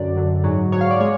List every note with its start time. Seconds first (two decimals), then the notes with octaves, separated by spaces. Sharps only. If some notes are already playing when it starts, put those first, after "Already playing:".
Already playing: F#2 D3 F#3 D5
0.15 F#2 D3 F#3
0.44 G#2 F#3
0.72 G#2 F#3 C#5
0.81 F5
0.91 D5
1.00 G#3 C#5